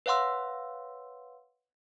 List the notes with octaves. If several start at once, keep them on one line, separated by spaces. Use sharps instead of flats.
B4 C#5 F5 F#5 C6 E6